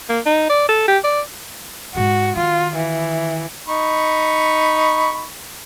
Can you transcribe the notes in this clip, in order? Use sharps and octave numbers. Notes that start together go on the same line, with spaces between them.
A#3
D#4
D5
A4
G4
D5
G#2 G#3 F#4
D#3 F4
E3
D#4 B5 C#6